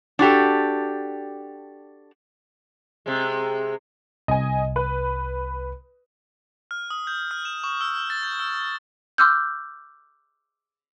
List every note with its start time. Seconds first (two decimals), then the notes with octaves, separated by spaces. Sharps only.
0.19 D4 F#4 G4 A4
3.06 C3 G#3
4.28 C2 D#5 G#5
4.76 B4
6.71 F6
6.90 D#6
7.07 G6
7.31 F6
7.45 E7
7.64 C#6
7.81 E6
8.10 A6
8.23 G6
8.40 E6
9.18 C6 D6 E6 F6 G6